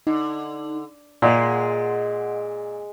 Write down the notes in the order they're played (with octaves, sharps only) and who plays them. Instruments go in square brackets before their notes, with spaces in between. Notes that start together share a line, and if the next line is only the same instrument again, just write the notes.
[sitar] D3 [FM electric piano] D#4
[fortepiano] A#2 [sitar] G#3 [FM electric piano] D#5 F#5 C6